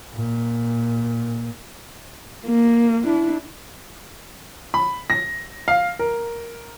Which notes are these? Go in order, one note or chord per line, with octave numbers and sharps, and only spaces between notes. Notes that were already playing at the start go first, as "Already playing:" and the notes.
A#2
A#3
D4 E4
B5
A#6
F5
A#4